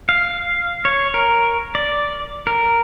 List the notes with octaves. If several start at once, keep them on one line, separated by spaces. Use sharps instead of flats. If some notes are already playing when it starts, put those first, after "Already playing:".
F5
C#5
A#4
D5
A#4